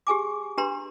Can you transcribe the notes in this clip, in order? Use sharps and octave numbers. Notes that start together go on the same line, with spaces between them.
G4 G#4 G#5 D6
D4 G4 B4 A#5 C6